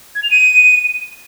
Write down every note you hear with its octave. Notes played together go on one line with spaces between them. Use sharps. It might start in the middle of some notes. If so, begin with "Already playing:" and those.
G#6
F7
D#7